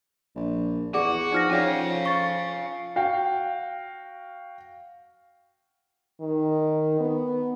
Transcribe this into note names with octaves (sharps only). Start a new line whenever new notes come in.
A#1
E2 F#4 G#4 D5
F3 D#4 F6 A#6
F3 C#4 C#5 D5 F5 G#5
C#6 A6
F#4 F5 G5
D#3
B3